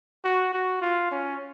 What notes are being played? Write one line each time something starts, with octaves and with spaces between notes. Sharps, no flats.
F#4
F#4
F4
C#4